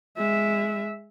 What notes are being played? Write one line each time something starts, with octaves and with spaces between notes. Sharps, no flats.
G#3 E5